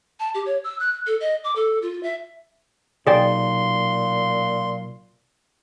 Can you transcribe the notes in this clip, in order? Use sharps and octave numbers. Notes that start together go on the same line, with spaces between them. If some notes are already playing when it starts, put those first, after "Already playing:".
A5
G4
C#5
E6
F#6
A4
D#5
D6
A4
F4
E5
B1 A#2 G#4 D5 G5 C6